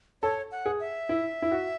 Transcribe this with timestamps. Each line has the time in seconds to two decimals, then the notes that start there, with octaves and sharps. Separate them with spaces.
0.22 A4 C#5
0.51 F#5
0.66 G#4
0.80 E5
1.09 E4
1.42 E4
1.52 F#4